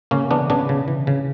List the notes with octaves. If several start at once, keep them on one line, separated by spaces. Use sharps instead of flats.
C#3 A#3 C#4
E3 B3 D4
C#3 B3 D4
C#3
E3
C#3